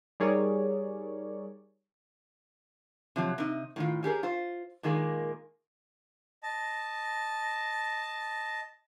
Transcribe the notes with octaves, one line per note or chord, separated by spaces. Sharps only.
G3 D#4 G#4 A#4 C#5 D5
C3 F3 F#3
C3 D#4
A2 D#3 F4
C#4 G4 G#4 A#4
F4 C5
A#2 D#3 G#3 A#3
D#5 A5